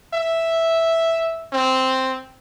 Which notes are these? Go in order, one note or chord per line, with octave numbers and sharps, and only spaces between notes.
E5
C4